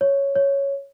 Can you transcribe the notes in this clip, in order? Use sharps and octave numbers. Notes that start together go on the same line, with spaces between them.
C#5
C#5